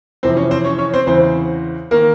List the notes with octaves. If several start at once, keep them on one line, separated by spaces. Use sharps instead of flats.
F2 C3 E3 C4 C5
C#4 C#5
C4 C5
C#4 C#5
C#4 C#5
C4 C5
E2 C#3 E3 C4 C5
D#3 A#3 A#4